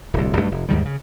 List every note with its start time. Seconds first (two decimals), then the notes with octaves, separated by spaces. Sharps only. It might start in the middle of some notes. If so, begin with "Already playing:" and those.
0.14 D1 C2
0.37 B1 G2 A3
0.51 F1
0.69 D#2 G#2 D#3 G3
0.85 C#3